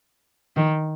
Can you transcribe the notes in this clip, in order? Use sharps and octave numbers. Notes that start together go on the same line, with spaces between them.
D#3